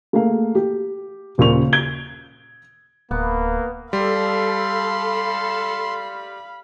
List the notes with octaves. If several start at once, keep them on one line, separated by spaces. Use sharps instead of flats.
A3 A#3 G#4 F5
G4
D#1 A#2 C#3 C#6 F7
G#6 D7 G7
D1 A#3 B3
G3 A4 F5 B5 C6